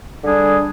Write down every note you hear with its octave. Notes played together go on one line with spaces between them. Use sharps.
D3 G3 D4 G#4